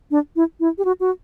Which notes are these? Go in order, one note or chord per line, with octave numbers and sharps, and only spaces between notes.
D4
E4
E4
G4
F#4
F#4